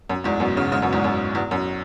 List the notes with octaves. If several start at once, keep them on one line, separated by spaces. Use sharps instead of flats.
F#2
E2 G#2
F#2 B2
G#2 C#3
G#2 C#3
F#2 B2
E2 G#2
F#2
E2
F#2